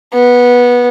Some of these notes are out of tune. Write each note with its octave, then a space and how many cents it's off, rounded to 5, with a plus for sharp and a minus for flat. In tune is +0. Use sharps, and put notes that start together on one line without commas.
B3 -15